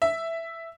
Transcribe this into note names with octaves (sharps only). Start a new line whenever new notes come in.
E5